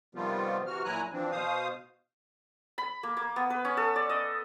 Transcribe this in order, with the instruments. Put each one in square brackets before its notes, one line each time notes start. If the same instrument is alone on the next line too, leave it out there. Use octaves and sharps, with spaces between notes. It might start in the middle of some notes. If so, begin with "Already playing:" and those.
[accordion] C3 D#3 F3 G3 B3 F4
C3 E3 F#4 F6
A#2 F#3 E4 G#5 A#5 F#6
E3 F3 C4 D4
B2 C5 F5 D#6
[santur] B5
A#3
A#3
B3
B4
C#4
A4
D5
D#5